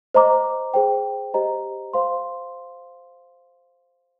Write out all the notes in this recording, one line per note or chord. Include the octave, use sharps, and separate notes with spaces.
C5 D#5 A#5 D6
G#4 C5 G5
G4 C5 D#5 A#5
C5 F5 C6